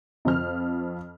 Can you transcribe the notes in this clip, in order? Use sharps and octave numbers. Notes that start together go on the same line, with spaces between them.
F2 F3 F6